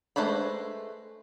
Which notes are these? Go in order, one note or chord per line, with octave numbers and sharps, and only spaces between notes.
G#3 A3 B4 C5 B5